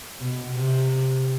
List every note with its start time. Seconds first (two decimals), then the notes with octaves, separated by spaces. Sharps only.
0.20 B2
0.53 C3